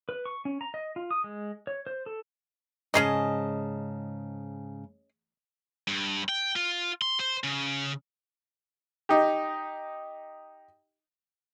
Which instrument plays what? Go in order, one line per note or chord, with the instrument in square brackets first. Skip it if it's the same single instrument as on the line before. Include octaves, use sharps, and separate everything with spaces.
[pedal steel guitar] B4
C#6
C#4
A#5
D#5
F4
D#6
G#3
C#5
C5
A4
[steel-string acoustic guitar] G#2 C#3 A5 [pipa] C#4 G#4 D#5
[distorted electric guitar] G2
G5
F4
C6
C5
C#3
[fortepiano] D#4 G4